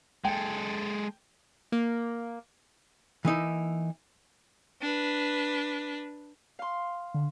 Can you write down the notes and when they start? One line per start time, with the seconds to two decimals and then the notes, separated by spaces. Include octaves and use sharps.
0.25 G#3 A4 G5
1.72 A#3
3.25 E3 A#3 D#4 E4
4.82 D4 B4
6.59 F5 C6
7.14 D3